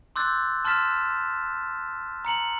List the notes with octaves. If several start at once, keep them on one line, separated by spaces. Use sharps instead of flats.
C6 D6 E6 F#6 G6 A6
A5 C6 F6 A6 B6 E7
A#5 C#7 F#7